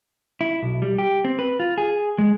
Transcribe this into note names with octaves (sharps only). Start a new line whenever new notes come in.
E4
B1
G3
G4
C4
B4
F4
G#4
G#3